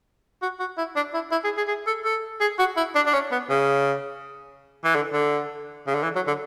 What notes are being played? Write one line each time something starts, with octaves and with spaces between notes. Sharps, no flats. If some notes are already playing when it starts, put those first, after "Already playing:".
F#4
F#4
E4
D4
E4
E4
G#4
G#4
G#4
A4
A4
G#4
F#4
E4
D4
D4
C#4
B3
C#3
E3
D3
D3
C#3
D3
E3
F#3
D3